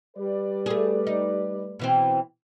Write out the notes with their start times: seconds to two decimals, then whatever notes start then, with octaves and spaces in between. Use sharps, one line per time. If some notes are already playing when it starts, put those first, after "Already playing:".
0.16 G3 B4 D5
0.66 A3 G#4
1.07 D#4
1.79 B2 E3 C4